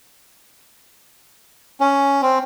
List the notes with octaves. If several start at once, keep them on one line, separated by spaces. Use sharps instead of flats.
C#4
C4